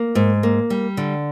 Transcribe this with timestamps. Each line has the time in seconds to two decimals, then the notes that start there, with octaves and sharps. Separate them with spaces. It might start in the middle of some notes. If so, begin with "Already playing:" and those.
Already playing: A#3
0.15 G#2
0.43 A#3
0.70 G3
0.97 D3